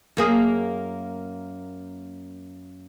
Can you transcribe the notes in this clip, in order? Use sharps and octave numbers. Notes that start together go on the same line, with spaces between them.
F#2 A#3 G#4